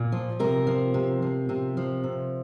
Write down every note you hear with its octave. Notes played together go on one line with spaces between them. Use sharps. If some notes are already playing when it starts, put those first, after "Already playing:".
Already playing: A#2
F3
C3 A#4
F3
C3
F3
C3
F3
C3